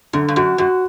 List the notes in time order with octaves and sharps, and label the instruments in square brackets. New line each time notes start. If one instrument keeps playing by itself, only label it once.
[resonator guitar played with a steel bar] F#2 [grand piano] D3
[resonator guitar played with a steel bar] G2
[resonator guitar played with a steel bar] F#2 [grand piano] F#4
[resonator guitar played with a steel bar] F#2 [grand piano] F#4